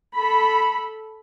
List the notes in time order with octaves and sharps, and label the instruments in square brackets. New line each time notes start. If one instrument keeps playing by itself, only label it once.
[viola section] A4 B5